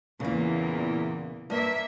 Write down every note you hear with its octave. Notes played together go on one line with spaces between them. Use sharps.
E2 A#2 C#3 E3 A#3
G2 A#3 E5